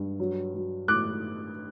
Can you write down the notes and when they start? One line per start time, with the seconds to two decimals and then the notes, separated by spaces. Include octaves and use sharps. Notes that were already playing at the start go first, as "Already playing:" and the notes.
Already playing: G2
0.20 F#3
0.54 F#3
0.88 A2 D6 F#6